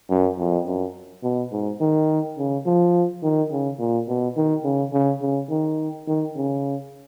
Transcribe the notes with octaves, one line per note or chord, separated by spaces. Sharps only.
F#2
F2
F#2
B2
G#2
D#3
C#3
F3
D#3
C#3
A#2
B2
D#3
C#3
C#3
C#3
D#3
D#3
C#3